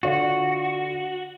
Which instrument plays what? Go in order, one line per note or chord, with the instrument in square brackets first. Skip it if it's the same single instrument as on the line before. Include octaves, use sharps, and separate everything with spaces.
[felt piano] D3 F4 D5 [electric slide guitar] F#4